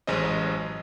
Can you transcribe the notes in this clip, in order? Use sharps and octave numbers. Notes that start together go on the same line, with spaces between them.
A1 F#2 G#3 C#4 C5 D#5